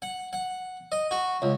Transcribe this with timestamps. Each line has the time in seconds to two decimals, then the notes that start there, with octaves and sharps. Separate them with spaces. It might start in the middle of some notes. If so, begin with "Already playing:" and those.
0.02 F#5
0.33 F#5
0.92 D#5
1.11 F#4
1.42 C#2